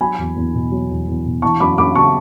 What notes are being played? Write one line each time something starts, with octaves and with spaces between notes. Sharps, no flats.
F#3 G#5 B5
E2
E2
B2
F#3
E2
E2
B2
E3 A5 C#6
F#2 B5 D6
F#2 B5 D6
C#3 A5 C#6